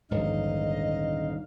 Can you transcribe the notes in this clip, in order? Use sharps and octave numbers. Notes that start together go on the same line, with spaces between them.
D#1 A#1 G#2 D3 D#4 D#5 F5